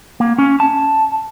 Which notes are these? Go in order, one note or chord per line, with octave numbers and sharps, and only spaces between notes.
A#3
C#4
A5